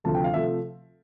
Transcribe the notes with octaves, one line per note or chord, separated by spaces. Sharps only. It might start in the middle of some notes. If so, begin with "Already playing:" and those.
D2 C3 F3 A3 A5
G5
F5
C3 F3 A3 E5